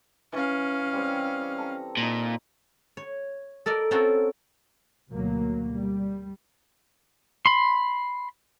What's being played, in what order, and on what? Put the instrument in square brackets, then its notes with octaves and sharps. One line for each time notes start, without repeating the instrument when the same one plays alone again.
[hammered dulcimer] E3 [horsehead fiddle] C#4 F5
[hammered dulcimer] G3 C4
A4 A#5
[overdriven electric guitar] A#2 [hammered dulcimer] D#4 A#5
[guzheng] C#5
A4 A#4 D5 D#5
C4 C#4 F4 F#4 A4 A#4
[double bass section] D2 B2 F#3 A#3
G3
[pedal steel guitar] B5 C6